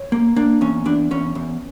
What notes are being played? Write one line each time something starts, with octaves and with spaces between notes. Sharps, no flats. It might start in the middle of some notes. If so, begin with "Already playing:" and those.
Already playing: C#5
A#3
A#3 D4
E2 C#4
E2 D4
E2 C#4
E2